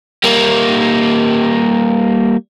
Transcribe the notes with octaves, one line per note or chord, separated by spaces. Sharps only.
G3 A#3